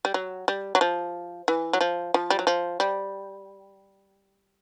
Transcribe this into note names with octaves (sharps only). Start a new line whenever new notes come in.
G3
F#3
G3
F#3
F3
E3
F#3
F3
F3
G3
F#3
F3
G3